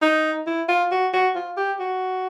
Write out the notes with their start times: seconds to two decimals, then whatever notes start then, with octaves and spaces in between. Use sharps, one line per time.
0.02 D#4
0.47 E4
0.68 F4
0.92 F#4
1.13 F#4
1.36 F4
1.57 G4
1.80 F#4